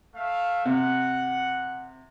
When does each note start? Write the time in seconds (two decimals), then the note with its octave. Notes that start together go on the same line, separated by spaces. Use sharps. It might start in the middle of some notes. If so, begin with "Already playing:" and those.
0.15 A3 E5 F5
0.65 C3 F#5